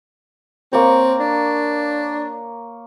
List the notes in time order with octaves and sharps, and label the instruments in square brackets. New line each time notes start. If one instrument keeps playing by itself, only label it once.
[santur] A#3 C#5 [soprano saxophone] C4
[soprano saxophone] D4